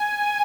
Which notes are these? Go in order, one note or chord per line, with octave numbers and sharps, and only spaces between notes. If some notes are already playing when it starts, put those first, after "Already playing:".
Already playing: G#5